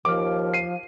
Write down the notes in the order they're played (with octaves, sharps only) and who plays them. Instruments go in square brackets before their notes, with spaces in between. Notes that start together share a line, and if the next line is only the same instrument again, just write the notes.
[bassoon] D#2 [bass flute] F3 [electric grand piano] D6 F6
[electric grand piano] C7 D#7